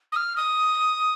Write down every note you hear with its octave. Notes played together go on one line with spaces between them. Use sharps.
D#6
F6
D#6